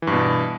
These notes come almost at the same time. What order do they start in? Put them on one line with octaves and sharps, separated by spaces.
E3 G2 B2